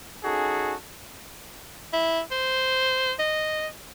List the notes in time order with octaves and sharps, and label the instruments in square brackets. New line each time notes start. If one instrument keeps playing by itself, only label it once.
[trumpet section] C#4 D#4 F#4 G#4 A4
[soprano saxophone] E4
C5
D#5